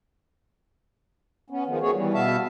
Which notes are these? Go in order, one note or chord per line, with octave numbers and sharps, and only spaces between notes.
B3 C#4
D#3 F3 G#3 B3
D#3 A3 B3 F#4 G#4 C#5
E3 G3
B2 B3 E5 F5 A5